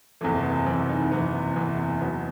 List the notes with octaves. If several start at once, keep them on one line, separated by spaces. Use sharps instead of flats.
F#1 E2 C3 E3 A3
B3
F#1 E2 C3 E3 C4
D#4
F#1 E2 C3 E3 B3
F#1 E2 C3 E3
E2 B2 F#3 B3